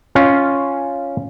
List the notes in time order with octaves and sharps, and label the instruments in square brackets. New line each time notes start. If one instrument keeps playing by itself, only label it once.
[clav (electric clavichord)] C#4 F4